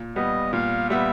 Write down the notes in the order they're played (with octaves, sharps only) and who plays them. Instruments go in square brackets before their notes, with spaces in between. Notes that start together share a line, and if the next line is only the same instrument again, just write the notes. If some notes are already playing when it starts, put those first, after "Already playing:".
Already playing: [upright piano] A#2
[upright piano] G3 B3 [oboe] D#5
[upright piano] A#2 [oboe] F5
[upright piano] G3 B3 [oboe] E5